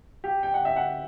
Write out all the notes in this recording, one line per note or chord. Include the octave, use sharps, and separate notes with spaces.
G4
G5
F#5
E5
F#5